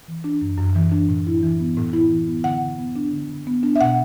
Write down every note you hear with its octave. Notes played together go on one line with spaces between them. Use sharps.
E3
D4
F#2
F#2
E3
D4
A2
E4
E3
B3
A2
E4
E3
B3
D3 F#5
D3
B3
D4
D3
D3
B3
D4
E5
B2 F#5